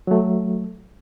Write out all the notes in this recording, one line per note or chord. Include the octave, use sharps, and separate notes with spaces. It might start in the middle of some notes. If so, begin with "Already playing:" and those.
F#3 A3